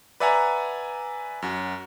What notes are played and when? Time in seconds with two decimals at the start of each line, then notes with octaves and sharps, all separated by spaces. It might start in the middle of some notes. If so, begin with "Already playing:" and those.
0.20 B4 D5 E5 F#5 G#5 A#5
1.42 F#2 F#4